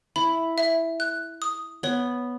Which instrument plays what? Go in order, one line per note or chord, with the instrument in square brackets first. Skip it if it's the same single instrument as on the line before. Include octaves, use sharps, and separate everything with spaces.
[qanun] E4 [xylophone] B5
[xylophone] E5
F#6
D#6
[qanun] B3 [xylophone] C#5